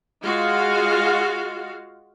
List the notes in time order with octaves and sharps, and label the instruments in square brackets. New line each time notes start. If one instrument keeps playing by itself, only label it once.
[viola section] G#3 F4 F#4 F5